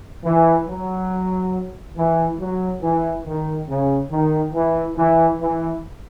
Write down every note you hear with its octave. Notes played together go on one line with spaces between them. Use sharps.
E3
F#3
E3
F#3
E3
D#3
C#3
D#3
E3
E3
E3